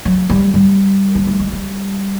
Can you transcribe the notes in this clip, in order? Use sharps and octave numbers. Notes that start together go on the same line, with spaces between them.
F#3
G3
G3
A#3
A3
G#3
G3